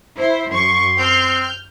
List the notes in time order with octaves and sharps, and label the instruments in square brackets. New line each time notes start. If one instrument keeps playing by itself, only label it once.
[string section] E4 C5
[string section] F#2 C#6 [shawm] C6
[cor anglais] C4 [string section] F6 G6